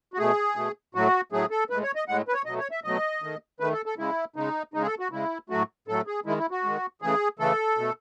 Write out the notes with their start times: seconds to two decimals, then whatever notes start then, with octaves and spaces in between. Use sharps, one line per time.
0.14 F#4
0.19 B2 A3 G#4
0.56 B2 A3
0.95 A2 F#3 A3 F#4
1.32 A2 F#3 A3 G#4
1.51 A4
1.70 A2 B4
1.74 G#3
1.83 C#5
1.95 D#5
2.08 A2 G#3 F#5
2.28 B4
2.33 C#5
2.46 B2 F#3 A3 D#5
2.59 C#5
2.71 E5
2.84 B2 F#3 A3 D#5
3.22 D#3 A3
3.60 D#3 A3 B4
3.73 A4
3.86 A4
3.97 C#3 G#3 E4
4.36 C#3 G#3 D#4
4.74 C#3 G#3 D#4
4.82 G#4
4.86 A4
4.99 F#4
5.11 C#3 G#3 E4
5.49 A2 F#3 A3 F#4
5.88 A2 F#3 A3 A4
6.07 G#4
6.26 D#3 G#3 E4
6.38 E4
6.51 F#4
6.64 D#3 G#3
7.02 C#3 E3 A3 G#4
7.39 C#3 E3 A3 A4
7.77 B2 A3